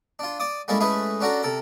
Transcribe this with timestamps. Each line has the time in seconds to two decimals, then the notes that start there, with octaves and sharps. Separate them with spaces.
0.19 D4 F4
0.39 D5 D6 D#6
0.68 G3 G#3 A#3 C#4 E4 A4
0.80 G#3 A3 C#4 E4 G#4 B4
1.21 C#4 D4 F#4 A4 A#5
1.43 C3 A4 A#4